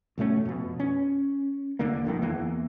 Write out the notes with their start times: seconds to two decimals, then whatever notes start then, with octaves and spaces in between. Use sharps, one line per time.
0.18 A1 B2 A3 C#4
0.45 F2 B2
0.80 C#4
1.79 E1 D3 A#3
2.05 G1 C2 F2 D#3
2.22 E2 E3 A#3